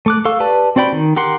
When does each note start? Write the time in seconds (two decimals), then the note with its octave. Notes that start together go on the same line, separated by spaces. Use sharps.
0.06 A3 D6 F#6
0.25 A4 F5 C#6
0.40 G4 B4 D5 A5
0.76 C4 F#4 D5 G5 B5
0.92 D#3
1.16 G4 A#4 F#5 C6